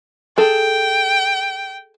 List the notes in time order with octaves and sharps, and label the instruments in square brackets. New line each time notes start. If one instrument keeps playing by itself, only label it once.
[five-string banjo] G#4 A4 [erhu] G5